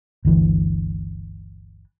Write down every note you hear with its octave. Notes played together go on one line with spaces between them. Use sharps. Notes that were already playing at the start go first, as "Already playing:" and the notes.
G1 D2 E3